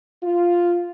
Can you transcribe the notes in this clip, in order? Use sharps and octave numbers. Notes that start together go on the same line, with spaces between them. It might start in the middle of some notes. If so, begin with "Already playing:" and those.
F4